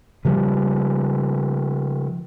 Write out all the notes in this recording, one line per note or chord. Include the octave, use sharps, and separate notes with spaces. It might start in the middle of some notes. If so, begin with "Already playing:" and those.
C#3 F3 G3